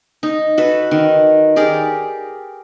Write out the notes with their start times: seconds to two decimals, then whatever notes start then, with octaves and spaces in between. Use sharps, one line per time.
0.23 D#4
0.58 F#4 A4 B4
0.91 D#3
1.56 G4 G#4 A#4 D5